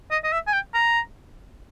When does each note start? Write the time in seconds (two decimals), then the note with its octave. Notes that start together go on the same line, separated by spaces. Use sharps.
0.11 D#5
0.24 D#5
0.32 E5
0.47 G#5
0.53 G5
0.74 A#5